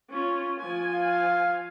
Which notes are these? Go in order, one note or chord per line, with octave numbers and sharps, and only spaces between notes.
C#4 F4
F3 G#5
F5